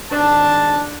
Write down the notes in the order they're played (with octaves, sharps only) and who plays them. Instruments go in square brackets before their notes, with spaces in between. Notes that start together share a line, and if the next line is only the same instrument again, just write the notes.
[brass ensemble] G#1 A5 [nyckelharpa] D4